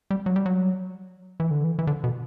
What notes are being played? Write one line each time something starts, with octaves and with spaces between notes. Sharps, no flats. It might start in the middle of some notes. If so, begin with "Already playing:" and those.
G3
F#3
G3
F#3
E3
D3
E3
E3
D3
B2